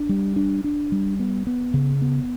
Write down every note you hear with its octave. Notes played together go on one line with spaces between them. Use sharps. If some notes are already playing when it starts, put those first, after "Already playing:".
Already playing: D4
G3
D4
D4
G3
B3
B3
C#3
B3